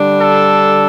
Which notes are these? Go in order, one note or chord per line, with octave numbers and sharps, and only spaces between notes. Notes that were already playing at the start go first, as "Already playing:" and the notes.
Already playing: D3 G3 D4
A4